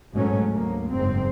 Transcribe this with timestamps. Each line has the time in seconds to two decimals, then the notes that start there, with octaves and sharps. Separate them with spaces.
0.12 G1 G#2 B2 F#3 A3 C#4
0.49 D2 A#3
0.90 F#1 G#2 C4